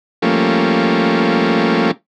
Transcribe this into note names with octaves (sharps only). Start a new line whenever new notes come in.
F3 G3 A3 A#3 C#4